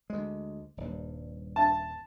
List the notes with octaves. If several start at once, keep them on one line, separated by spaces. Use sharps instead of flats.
D2 G#3
D#1 G2
A5